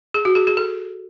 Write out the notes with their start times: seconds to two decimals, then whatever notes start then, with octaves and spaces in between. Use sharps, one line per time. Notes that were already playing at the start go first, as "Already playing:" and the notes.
0.14 G#4
0.25 F#4
0.35 G#4
0.47 G#4
0.57 A4